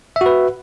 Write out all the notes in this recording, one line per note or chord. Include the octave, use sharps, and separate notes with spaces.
F#4 B4 E5